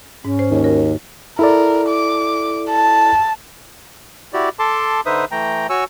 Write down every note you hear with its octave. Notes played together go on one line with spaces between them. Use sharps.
G#2 C#4
C5
D#2
F#4 A#4
E4 A4 A#4 D5
D6
A5
E4 F#4 G4 D5
A4 A5 C6 D6
D3 D#4 B4 C5 E5 D#6
E3 A3 G5 A#5
F#4 C#5 G#5 C#6 E6